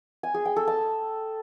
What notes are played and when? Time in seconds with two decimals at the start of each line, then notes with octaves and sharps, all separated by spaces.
0.23 G#5
0.34 G#4
0.45 G5
0.56 A4
0.67 A5